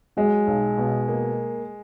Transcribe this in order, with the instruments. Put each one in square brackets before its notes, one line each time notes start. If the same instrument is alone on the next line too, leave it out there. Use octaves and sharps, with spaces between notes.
[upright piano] F#3 [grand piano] G#3
[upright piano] B1
B2
A#3